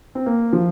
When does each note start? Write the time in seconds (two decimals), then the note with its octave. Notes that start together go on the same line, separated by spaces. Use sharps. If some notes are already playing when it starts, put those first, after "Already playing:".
0.15 C4
0.26 A#3
0.53 F3